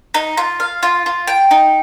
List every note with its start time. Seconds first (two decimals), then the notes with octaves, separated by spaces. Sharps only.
0.14 D#4
0.37 F4
0.60 F5
0.83 F4
1.06 F4
1.28 G5
1.51 D#4